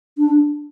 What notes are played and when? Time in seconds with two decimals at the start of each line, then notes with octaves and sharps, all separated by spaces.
0.18 D4